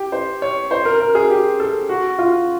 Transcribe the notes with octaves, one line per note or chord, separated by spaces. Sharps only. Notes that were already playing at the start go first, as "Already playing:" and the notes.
Already playing: G4
C5
C#5
C5
A#4
A#4
G#4
G4
A4
F#4
F4